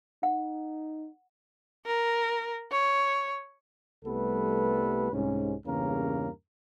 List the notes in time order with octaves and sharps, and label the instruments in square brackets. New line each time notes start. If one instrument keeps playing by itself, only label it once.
[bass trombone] D#4 [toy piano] F#5
[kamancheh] A#4
C#5
[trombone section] C2 G3 A3 B3 A4 B4
C2 G#2 C#4
E2 G2 C#3 A#3 C#4 A#4